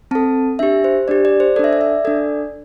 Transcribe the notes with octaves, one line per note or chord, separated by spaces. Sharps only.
C4 A4 A5
D4 G4 E5
C5
D4 G4 D5
D5
C5
D4 A4 D5 E5
D5
E5
D4 A4 D5